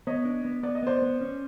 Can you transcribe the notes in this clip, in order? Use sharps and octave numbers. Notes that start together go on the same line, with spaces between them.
B3 C#5 D#5
D4
B3
B3 D5
D#5
B3 C5 D5
B3
C#4